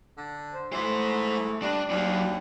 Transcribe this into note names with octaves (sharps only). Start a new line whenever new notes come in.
D3
C5
E3 G#3 A3 C5
G2 D4
D#2 F#3 D4